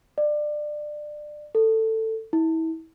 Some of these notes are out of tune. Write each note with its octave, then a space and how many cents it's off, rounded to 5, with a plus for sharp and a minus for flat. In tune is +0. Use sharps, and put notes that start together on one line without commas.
D5 +25
A4 +15
E4 -35